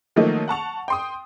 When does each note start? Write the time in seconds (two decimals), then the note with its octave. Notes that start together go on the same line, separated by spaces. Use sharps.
0.16 D#3 F3 F#3 A3 A#3 D#4
0.48 F#5 A5 C#6 F7
0.88 G5 C6 D#6